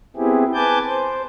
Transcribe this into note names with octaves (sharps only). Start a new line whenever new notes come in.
B3 C4 E4 G4 G#4
B4 G#5 A5 D6 G6
C5